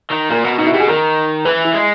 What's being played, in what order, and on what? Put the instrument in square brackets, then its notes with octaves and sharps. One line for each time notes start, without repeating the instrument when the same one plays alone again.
[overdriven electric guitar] D#3
[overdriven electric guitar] A#2 [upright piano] A#4
[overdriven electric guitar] B2
[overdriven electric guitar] B2 [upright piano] D#4
[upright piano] E4
[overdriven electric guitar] B2 [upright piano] G4
[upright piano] G#4
[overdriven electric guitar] D#3 [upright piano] A#4
[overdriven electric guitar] E3 [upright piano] B4
[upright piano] E4
[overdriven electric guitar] G#3